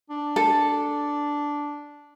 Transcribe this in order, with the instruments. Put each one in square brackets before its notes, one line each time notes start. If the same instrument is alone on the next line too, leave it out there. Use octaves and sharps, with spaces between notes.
[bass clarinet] D4
[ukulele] A4